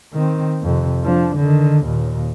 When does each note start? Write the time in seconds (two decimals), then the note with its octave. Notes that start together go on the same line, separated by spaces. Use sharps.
0.13 D#3 C4
0.62 F2 C3
1.04 F3 D4
1.37 D3 D#3
1.84 D#2 A#2